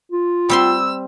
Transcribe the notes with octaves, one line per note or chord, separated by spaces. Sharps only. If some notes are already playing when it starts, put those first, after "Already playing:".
F4
G3 C4 C6 E6